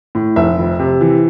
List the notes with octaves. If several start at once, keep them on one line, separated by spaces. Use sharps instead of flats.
A2
F1 E5
F2
C3
E3